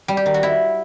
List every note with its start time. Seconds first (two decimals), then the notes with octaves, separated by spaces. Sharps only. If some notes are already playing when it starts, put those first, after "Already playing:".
0.08 G3
0.17 G4
0.26 D#3
0.34 F#4
0.43 E4